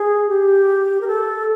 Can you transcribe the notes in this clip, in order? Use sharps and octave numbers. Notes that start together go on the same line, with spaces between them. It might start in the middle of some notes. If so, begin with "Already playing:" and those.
Already playing: G#4
G4
A#4
A4